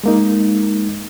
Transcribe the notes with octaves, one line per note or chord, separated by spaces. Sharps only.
G#3 A#3 D#4